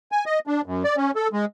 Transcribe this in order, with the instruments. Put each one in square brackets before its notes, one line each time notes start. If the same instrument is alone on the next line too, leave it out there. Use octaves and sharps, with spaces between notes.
[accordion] G#5
D#5
D4
F#2
D5
C#4
A4
G#3